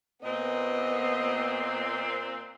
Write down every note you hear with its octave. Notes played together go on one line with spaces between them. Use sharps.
A#2 B3 C4 D#5